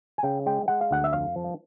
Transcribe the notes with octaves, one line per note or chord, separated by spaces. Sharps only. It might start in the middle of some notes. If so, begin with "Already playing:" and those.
G#5
C#3 G5
G#3 G5
G#3 F#5
F5
D2 F#5
E5
F2 F5
F3